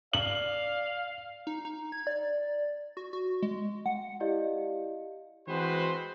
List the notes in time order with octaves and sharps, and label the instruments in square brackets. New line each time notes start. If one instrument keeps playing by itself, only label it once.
[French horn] D5 [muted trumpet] F5 [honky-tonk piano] F#7
[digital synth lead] D#4
D#4
G#6
D5
F#4
F#4
G#3
F#5
[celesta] E4 G4 D5 D#5 F5
[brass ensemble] E3 G#3 C4 F#4 B4 C5